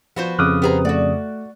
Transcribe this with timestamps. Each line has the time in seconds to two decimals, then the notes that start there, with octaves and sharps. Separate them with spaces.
0.16 F3 B3 F#4 C5
0.39 F2 C#3 D6 D#6 F6 F#6
0.62 B3 G4 G#4 B4 C5 A#5
0.85 A3 F#4 D5